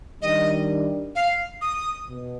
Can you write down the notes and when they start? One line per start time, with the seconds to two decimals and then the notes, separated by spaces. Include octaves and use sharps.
0.22 D#3 G3 D4 D#5
1.15 F5
1.61 D#6
2.09 B2